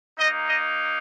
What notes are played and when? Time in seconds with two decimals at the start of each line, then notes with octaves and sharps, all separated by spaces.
0.19 A#3 D#4 D#5
0.47 D#5